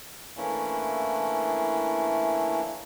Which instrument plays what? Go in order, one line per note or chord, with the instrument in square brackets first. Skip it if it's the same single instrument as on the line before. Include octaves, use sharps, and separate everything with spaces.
[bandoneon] E3 A3 A#3 C#4 D4 E4